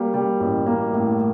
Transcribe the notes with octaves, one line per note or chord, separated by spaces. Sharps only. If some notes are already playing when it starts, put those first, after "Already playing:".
Already playing: G3 A#3
G3
A1
A#3
A2